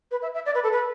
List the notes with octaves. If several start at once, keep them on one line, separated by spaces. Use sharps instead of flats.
B4
E5
E5
D5
B4
A4
B4